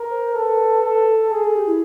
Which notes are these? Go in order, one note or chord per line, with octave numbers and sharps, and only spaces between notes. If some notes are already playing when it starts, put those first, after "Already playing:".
Already playing: A#4
C5
A4 B4
A4
G#4 A4
A4
G4
E4